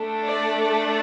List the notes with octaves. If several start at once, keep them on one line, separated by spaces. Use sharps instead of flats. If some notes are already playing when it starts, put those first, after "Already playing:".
Already playing: A3 D4 A4
D5
D5